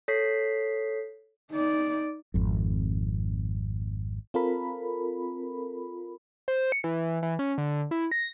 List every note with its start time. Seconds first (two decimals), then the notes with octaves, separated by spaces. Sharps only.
0.08 A4 C#5 B6 C7
1.52 D#4 D5
2.34 G#1 F2
4.34 C4 F4 A4 A#4 B5
6.48 C5
6.72 C#7
6.84 E3
7.22 E3
7.39 C#4
7.58 D3
7.91 E4
8.11 A#6